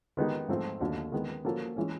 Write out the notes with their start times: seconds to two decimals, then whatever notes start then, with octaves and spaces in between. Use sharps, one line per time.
0.17 D#3 G#3 B3 D#4 G4
0.48 G#2 F3 A3 C4
0.80 D#2 D3 F#3 A3
1.12 D#3 G#3 B3
1.45 F3 A#3 C#4 F#4 A4
1.76 E3 G#3 C#4